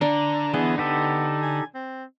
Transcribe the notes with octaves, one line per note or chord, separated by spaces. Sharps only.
D3 D4 A#5
E3 B3 G#4 D#5
B3 D#4 G4 A4
G#5
C4